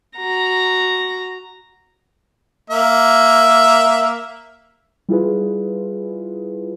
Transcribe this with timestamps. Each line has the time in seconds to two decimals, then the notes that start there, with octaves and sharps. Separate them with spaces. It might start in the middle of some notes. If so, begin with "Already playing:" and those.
0.17 F#4 A#5
2.70 A#3 E5
5.09 G3 E4 F4 G#4 B4